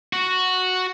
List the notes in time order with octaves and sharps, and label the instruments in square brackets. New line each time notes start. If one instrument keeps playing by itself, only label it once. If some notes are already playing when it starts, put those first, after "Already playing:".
[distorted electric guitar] F#4